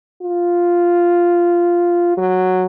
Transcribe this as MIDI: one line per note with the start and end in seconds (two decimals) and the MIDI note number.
0.22 2.12 65
2.17 2.66 54